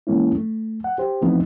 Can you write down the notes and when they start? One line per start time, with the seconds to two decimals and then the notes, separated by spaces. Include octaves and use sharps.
0.07 E3 G#3 A#3 C#4 E4
0.35 A3
0.84 F#5
0.98 G4 C5
1.21 E3 F3 A3 B3 C4 D#4